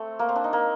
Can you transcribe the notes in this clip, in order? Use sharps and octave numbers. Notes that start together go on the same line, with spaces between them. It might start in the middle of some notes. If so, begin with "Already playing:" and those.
Already playing: A3 C4
A#3
C4
D4
D#4
A#3